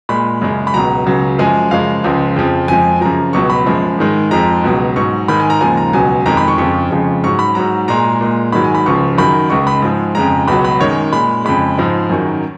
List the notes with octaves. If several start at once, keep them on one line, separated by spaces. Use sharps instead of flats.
A#2 G#3 B5
F#2 C#3 G#3
B5
C#2 B2 F#3 A#5
C#2 C#3 F#3
F#2 F3 G#3 G#5
F#2 C#3 F3 G#3 F5
C#2 C#3 F3 G#3
F2 C#3 F3
F2 F3 G#3 G#5
F#2 C#3 F3 A#5
C#2 B2 F#3 C#6
B5
F#2 F3 G#3
G#2 D#3 G#3
F2 F3 G#3 A#5
C#2 B2 F#3
G#2 F#3 C#6
G#2 D#3 G#3 B5
G#5
A#5
D#2 C#3 F3 G#3 G#5
A#5
C#2 B2 F#3 G#5
F2 D#3 G#3 A#5
B5
C#6
F2 C#3 F3 C#6
F2 C#3 F3 G#3
G#2 F#3 C#6
B5
G#2 F#3 A#5
A#2 G#3 A#5
A#2 G#3
G#2 D#3 F#3 B5
G#5
B5
C#2 C#3 F3 C#6
F#2 D#3 F#3 B5
C#2 C#3 G#3 C#6
B5
G#2 F3 G#3
F2 C#3 G#3 A#5
C#2 B2 F#3 B5
B5
F#2 D#3 G#3 C#5
A#2 G#3 B5
F2 C#3 G#3 B5
G#2 F3 G#3
F#2 D#3 F#3